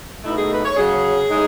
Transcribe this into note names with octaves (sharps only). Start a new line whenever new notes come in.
B2 A3 D#4 E4
G#4
B4
C#5
C#3 F#3 C#4 G#4
A2 G#3 D#4